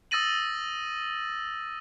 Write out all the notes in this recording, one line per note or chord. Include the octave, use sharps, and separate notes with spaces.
D#6 E6 A6 A#6 D#7 F#7